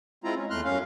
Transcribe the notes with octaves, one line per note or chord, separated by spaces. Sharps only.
G#3 C4 E4 F4 A#5
C#4
E2 A3 C6 F6 F#6
F#2 C#4 F5